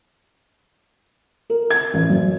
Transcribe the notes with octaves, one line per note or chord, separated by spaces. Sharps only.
A#4
G#6
A1
F#2